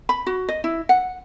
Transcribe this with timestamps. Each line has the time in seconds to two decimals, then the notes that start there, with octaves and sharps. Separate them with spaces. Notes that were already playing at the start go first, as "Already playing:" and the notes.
0.09 B5
0.27 F#4
0.48 D#5
0.64 E4
0.89 F#5